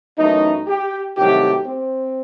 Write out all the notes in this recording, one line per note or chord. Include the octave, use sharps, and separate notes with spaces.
F#2 E3 A3 D#4
G4
C2 C3 D#3 F#3 A3 G4
C4